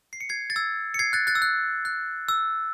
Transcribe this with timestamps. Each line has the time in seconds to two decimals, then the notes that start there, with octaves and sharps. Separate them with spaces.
0.13 C7
0.21 C#7
0.29 G#6 C7
0.50 A6
0.56 E6 G#6
0.94 C#7
0.99 G#6 C7
1.13 F#6 A6
1.27 F#6 A6
1.35 E6
1.42 F#6
1.85 F#6
2.28 E6